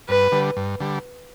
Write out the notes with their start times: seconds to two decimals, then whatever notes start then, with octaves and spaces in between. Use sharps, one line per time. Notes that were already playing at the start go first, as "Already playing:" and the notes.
0.08 G2 B4
0.32 D3 G3
0.57 G2
0.80 D3 G3